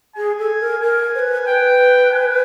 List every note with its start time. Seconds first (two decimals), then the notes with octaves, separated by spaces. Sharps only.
0.16 G#4 G#5
0.39 A4
0.60 A#4
0.81 A#4 G#5
1.15 C5
1.19 B4
1.47 B4 G5
2.12 G#5